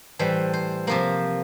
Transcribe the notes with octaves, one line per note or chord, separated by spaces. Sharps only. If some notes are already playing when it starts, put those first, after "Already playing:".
A2 E3 G3 C5
C5
C3 F3 A#3 C5